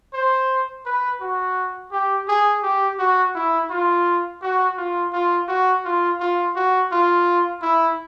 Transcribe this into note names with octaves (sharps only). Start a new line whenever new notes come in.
C5
B4
F#4
G4
G#4
G4
F#4
E4
F4
F#4
F4
F4
F#4
F4
F4
F#4
F4
E4